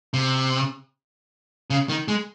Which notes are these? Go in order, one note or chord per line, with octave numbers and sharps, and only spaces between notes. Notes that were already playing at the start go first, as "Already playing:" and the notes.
C3
C#3
D#3
G#3